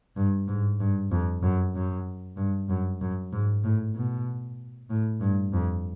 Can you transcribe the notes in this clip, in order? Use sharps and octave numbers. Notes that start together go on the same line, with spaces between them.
G2
G#2
G2
F2
F#2
F#2
G2
F#2
F#2
G#2
A2
B2
A2
G2
F2